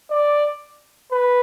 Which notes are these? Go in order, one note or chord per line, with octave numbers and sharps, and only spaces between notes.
D5
B4